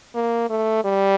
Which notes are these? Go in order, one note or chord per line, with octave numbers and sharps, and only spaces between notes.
A#3
A3
G3